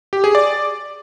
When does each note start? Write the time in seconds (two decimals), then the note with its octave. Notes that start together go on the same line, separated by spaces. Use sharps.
0.13 G4
0.24 G#4
0.35 D5